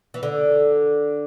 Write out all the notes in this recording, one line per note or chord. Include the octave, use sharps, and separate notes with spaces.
E3
D3